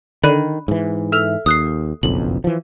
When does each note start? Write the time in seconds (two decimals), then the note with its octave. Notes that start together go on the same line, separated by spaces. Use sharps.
0.24 D3 D#3 B5 F#6 D#7
0.68 G#2 E3
1.12 A4 E5 F6 F7
1.46 D#2 D#6 F#6 C7
2.03 F#1 B1 F2 F#7
2.44 E3 F3